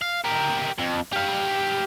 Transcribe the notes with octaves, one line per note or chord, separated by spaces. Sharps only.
F5
G4 A#4
F2
G4 F5